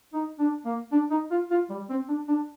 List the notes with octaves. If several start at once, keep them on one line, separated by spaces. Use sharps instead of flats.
D#4
D4
A#3
D4
D#4
F4
F4
G3
C4
D4
D4